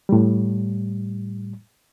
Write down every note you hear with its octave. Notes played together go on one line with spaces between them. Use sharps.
A2 G3